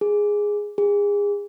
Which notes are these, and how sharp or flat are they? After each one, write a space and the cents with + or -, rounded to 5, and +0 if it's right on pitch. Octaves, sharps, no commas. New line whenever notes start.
G#4 -5
G#4 -30